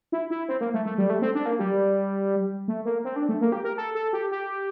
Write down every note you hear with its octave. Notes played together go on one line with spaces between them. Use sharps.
E4
E4
C4
A#3
A3
A3
G3
A3
C4
D4
A#3
G3
A3
A#3
C4
D4
A3
A#3
G4
A#4
A4
A4
G4
G4